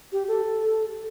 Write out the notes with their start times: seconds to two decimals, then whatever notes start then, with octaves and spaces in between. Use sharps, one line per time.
0.12 G4
0.28 A4